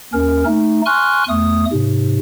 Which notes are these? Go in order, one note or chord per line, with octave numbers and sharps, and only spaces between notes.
D#2 C#4 A#4
A3 D#4
G#5 C6 C#6 F6 F#6
E2 A3 D#6
G#2 C3